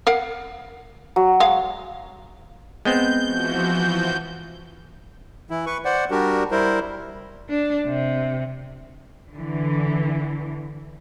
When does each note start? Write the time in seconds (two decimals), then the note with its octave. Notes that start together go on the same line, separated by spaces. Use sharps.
0.07 A#4 F5 F#5
1.16 F#3
1.40 G#3 F5
2.85 G#3 B3 C4 G6
3.25 E3 F3 F#4
5.50 E3 E4
5.66 B4 C#6
5.85 C5 D5 F#5
6.11 G3 D4 F#4 G4 A#4
6.51 G3 E4 A#4 C5
7.49 D4
7.86 C3
9.31 D3 E3